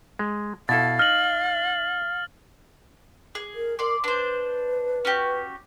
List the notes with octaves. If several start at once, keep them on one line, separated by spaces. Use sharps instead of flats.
G#3
B2 E4 A4 F5 A6
D#4 F6 F#7
G#4
A#4
A#4 D5 C6
D4 B4 C5
C#4 F#4 G4